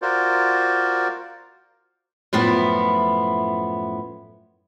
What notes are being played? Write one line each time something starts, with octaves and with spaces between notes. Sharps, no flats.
F4 F#4 A#4 C5 D5
F#2 A2 F3 B3 E4